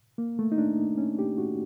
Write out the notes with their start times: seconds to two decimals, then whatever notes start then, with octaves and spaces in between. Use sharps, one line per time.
0.18 A#3
0.39 A3
0.52 D#4
0.58 D4
0.98 C#4
1.19 G4
1.38 F#4